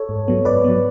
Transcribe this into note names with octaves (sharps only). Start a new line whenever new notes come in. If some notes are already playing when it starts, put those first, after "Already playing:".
Already playing: A4 C#5
G#2
F#3 B3
G#2 B4 D5
F#3 B3